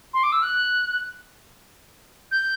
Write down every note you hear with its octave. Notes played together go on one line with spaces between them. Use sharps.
C6
D6
E6
F#6
G6